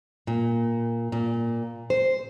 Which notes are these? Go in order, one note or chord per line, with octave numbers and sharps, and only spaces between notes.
A#2
A#2
C5